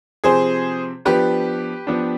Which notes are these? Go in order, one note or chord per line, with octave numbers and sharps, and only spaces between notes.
C3 F3 C4 G#4 C5
F3 B3 D4 G4 B4
F3 B3 D4